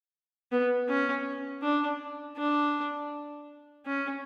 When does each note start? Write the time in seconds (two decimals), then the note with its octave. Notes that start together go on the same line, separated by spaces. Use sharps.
0.52 B3
0.89 C#4
1.63 D4
2.37 D4
3.86 C#4